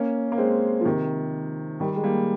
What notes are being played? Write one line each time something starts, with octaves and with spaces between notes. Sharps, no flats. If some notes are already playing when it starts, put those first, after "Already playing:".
Already playing: A#3 C#4
A#3
G#3 C4
F3
C3 D#3
D#3 G3
G#3
G3 A#3